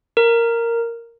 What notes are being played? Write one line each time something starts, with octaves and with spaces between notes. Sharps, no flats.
A#4